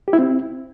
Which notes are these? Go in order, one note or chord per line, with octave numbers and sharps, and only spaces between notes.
G4
E4
C4